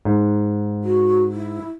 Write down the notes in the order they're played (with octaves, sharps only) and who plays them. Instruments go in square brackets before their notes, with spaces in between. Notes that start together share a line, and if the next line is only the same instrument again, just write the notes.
[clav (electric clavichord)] G#2
[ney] F#4
E4